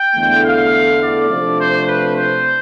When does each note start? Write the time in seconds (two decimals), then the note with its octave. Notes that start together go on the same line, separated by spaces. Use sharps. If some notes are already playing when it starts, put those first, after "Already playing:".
Already playing: G5
0.15 E2 D3 A3
0.44 F5
1.01 D5
1.29 C3 F3 A3 D4
1.58 C5
1.86 B4
2.15 C5